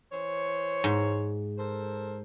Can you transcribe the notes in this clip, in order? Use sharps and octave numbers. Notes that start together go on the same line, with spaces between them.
E3 C5 C#5
G#2
A4 A#4 C5